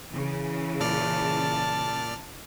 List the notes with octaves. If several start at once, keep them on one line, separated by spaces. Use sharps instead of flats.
C#3 E3
A#2 D5 A5 F6